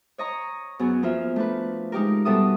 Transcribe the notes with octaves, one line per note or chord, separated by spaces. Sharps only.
C#5 D#5 A#5 C#6
F#2 B3 G#4
F3 A#3 F4 E5
A3 D4 B4
G#3 D#4 G4 A#4
B2 G3 A4 E5 D#6